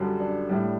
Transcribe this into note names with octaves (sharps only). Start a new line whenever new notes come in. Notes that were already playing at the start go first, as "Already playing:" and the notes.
Already playing: F#2 D3 G3
D4
A2 G3